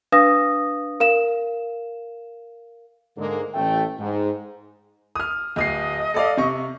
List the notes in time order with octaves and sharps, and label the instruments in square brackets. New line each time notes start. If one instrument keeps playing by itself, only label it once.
[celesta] D4 B4 F5 D#6 A#6
A#4 F5 E7
[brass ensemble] G#2 D3 G#3 A#3
A1 A3 G5
G#2
[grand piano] D#6 F6
[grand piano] D1 D#6 C7 [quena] D#5
[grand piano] A4 D5 F5
C3 C#6